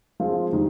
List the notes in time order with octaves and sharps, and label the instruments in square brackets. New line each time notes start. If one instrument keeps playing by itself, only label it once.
[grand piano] F3 G#3 C4 F4
D#3 G3